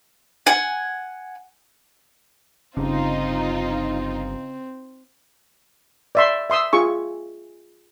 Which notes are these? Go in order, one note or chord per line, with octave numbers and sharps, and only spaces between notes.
F#5 G#5
G1 C#3 C4 D#4 F4
D5 E5 C6
E5 C6 D#6 E6
F4 G#4 C#6